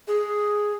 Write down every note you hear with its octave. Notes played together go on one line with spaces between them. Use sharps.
G#4